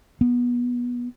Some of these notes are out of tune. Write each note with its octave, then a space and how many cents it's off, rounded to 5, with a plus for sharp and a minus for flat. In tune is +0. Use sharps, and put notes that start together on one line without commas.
B3 -20